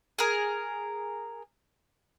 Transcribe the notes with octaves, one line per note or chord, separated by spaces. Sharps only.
G#4 A#4